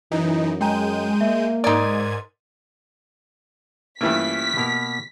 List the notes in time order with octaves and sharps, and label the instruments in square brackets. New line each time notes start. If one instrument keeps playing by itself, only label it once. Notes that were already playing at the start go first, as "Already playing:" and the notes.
[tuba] F#2 [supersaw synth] E3 D#4
[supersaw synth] G#3 G6 D#7 [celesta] G5 G#5 A#5
[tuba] A#3 [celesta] E5
[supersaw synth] G#2 G#6 D#7 [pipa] D#4 D5 [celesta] A#4 C6
[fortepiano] G2 E3 A3 [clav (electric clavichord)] A#3 C#4 F4 [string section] B6
[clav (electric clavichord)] B2 A#3 A#4